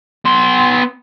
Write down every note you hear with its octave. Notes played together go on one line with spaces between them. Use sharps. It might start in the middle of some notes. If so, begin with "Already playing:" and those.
B3 C6